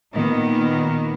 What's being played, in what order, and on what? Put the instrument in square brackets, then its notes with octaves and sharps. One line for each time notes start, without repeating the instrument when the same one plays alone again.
[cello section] A#2 D#3 A#3 B3